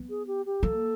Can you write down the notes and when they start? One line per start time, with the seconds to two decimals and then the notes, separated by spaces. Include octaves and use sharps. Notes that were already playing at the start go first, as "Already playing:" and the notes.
Already playing: B3
0.10 G#4
0.27 G4
0.46 G4
0.63 A#3 A4